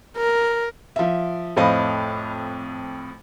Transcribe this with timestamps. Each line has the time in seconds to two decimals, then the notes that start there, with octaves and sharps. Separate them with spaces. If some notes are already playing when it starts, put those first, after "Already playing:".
0.17 A#4
0.96 F3 E5
1.56 F2 A2 C5 D#5 F5 B5